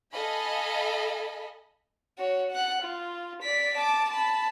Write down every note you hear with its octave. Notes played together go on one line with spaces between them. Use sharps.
A4 D#5 F5 G#5 B5
F#4 C#5
F#5 F#6
F4
D5 B6
A5 D6
A5 B5